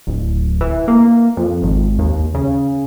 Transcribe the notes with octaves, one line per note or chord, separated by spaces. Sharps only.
D1
E3
A#3
F2
G#1
D#2
C#3